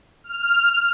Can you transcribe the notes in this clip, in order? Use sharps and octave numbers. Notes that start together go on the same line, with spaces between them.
F6